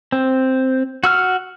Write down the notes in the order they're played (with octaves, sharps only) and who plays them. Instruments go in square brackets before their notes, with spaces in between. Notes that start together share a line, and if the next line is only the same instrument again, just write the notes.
[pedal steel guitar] C4
F#4 E6 F6